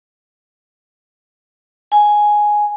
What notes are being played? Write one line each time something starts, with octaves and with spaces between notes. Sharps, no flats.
G#5